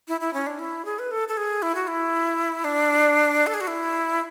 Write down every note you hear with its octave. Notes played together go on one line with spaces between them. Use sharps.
E4
E4
C#4
D4
E4
G#4
B4
A4
A4
G#4
E4
F#4
E4
D4
A4
G#4
F#4
E4